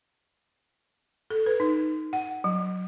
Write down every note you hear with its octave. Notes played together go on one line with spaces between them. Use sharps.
A4
B4
D#4
F#5
F#3